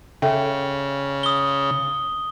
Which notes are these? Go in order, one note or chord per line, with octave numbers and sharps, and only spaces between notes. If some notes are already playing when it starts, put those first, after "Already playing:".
C#3 A4 E5 G5
D#6 G7